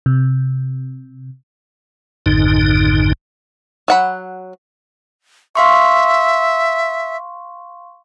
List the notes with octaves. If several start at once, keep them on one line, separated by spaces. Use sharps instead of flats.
C3
G#1 F2 G#2 D3 D#4
F#3 F#5 B5
E5 F5 C6 C#6